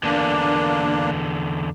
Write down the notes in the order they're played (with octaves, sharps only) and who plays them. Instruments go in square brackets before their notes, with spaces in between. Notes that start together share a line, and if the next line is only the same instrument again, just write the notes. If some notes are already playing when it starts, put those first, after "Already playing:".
[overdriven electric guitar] E2 D3 [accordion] A#3 D4